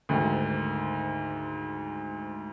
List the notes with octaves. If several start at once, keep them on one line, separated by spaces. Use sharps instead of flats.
D2 G#2 D#3